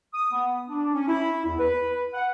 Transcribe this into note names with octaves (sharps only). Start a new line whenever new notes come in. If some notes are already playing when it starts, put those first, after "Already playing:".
D#6
B3
D4
C#4
E4
E2
B4
F#5